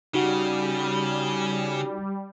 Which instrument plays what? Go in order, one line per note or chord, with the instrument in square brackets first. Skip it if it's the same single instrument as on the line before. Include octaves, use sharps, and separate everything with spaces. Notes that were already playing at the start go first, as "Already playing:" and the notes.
[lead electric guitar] C#3 [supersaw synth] G3 [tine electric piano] D#4 F#4 F#5